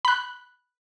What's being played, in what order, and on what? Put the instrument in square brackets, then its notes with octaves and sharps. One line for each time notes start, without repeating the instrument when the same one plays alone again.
[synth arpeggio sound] B5 F#6